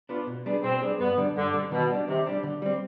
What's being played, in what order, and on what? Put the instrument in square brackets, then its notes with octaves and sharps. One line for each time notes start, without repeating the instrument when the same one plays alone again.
[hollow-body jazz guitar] B3 D4 F4
B2
G3 B3 D4 G#4
[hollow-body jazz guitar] B2 [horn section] C4
[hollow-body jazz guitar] G3 B3 D4 G#4
[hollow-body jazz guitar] G2 [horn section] B3
[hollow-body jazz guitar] D3 G3 D4
[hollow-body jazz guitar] G2 [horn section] D3
[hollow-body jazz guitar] D3 G3 D4
[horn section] B2 [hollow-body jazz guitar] D#3
[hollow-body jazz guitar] G3 D4
[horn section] C3 [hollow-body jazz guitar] D#3
[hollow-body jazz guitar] G3 D4
D3
G3 C4